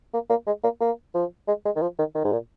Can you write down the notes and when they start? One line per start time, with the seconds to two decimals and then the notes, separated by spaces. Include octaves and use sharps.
0.13 A#3
0.30 A#3
0.47 G#3
0.63 A#3
0.81 A#3
1.14 F3
1.48 G#3
1.65 G#3
1.76 D#3
1.82 F3
1.99 D#3
2.15 D#3
2.24 G#2
2.32 A#2